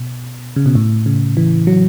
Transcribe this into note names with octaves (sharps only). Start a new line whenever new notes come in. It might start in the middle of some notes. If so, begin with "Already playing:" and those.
Already playing: B2
C#3
B2
A2
C#3
E3
F#3